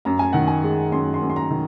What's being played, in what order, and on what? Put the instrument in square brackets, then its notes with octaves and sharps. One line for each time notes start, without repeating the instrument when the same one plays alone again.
[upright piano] F#2 A#5
G#5
D#3 F#5
G#5
G#3
F#2 C6
C6
F#2
C6
A#5
D#3